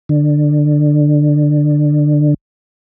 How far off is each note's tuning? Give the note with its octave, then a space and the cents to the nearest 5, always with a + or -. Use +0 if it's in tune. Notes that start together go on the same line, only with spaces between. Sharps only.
D3 +15